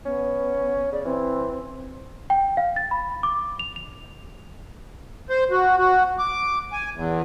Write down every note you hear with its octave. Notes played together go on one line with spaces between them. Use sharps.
B3 C#4
C#3 D5
E3 C4
G5
F5
A6
B5
D6
F7
F7
C5
F#4
F#4
D6
G#5
E2